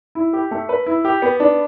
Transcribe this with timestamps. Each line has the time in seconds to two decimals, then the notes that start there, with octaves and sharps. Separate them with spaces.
0.15 E4
0.33 G4
0.51 A3
0.69 B4
0.86 E4
1.05 G4
1.22 B3
1.40 D4